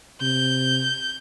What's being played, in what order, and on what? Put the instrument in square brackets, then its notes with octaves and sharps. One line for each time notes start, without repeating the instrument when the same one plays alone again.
[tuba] C3 [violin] G6